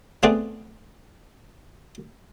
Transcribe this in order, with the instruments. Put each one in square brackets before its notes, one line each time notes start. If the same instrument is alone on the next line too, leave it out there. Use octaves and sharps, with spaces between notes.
[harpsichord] A3 B3 C4 G#4 B4 D5